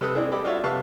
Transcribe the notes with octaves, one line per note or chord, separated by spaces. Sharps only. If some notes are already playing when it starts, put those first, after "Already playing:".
C3 C4 A4 B4 D#6
C4 D4 E4 G#4
G3 G4 A4 D#5 B5 D6
D4 F4 F#4 A4 C#5 E5
C3 B4 E5 F5 A5 C#6